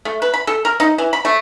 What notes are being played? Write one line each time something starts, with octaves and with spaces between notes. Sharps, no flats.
A3
B4
B5
A4
A#4
D#4
E3
B5
A3